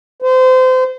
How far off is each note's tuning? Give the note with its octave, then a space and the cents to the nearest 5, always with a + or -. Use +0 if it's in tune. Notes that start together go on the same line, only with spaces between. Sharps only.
C5 -30